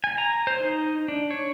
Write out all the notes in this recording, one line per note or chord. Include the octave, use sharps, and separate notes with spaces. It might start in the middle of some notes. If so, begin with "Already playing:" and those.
G#5
A#5
C5
D#4
D4
C#5